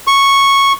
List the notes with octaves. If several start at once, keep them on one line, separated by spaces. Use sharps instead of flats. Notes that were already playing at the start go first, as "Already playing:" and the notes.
C#6